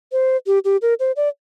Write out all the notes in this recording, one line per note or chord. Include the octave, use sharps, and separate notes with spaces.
C5
G4
G4
A#4
C5
D5